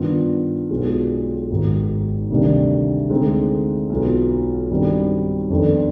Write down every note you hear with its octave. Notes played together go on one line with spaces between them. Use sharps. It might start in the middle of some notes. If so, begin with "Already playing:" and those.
Already playing: G2 D#3 B3 D4 F4
B1 B2 G#3 B3 F4
G#1 G#2 D#3
D2 C3 D#3 G3 D4
D2 D3 G#3 C4 D#4
B1 B2 B3 F4
G2 D#3 G3 C4 D#4
F2 D#3 B3 D4